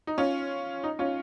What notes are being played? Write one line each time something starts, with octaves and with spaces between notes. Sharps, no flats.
D#4
C#4 F4
D#4
C#4 F4